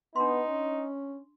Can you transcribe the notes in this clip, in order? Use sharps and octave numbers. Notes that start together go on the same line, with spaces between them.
B3 D4 D#4 C6
C#4